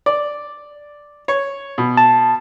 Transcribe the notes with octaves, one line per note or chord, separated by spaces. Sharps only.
D5
C#5
B2
A5